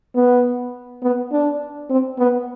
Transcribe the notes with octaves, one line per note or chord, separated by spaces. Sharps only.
B3
B3
D4
C4
B3